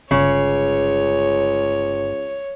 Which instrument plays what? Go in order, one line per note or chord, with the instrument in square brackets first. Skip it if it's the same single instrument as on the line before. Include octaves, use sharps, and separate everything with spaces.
[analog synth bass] G1 [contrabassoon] C#2 [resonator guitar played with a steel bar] C#3 [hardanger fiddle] C#5